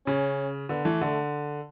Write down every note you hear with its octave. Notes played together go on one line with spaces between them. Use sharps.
C#3 C#4
D3 B3
E3 A3
D3